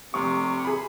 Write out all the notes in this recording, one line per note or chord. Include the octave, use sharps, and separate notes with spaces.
F1 C3 C#6
G#4 B5